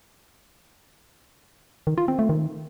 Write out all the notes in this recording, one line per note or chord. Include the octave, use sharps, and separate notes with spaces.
D#3
F4
C4
A3
D#3